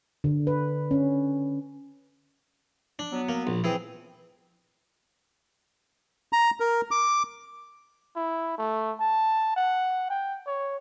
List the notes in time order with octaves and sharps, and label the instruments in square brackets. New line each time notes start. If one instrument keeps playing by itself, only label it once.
[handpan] D3
B4
C#4
[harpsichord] D4
[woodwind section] F#3 B3
[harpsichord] A#3
A#1
[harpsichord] E3 G#4 [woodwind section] C4
[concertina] A#5
A#4
D6
[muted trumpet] E4
A3
A5
F#5
G5
C#5